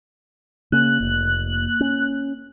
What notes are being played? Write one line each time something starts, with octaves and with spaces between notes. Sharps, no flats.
C#3 A#3 F#6
F1
C#4